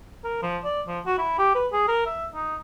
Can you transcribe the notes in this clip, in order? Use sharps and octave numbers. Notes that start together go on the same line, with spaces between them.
A#4
F3
D5
F3
F#4
E4
G4
B4
G#4
A#4
E5
D#4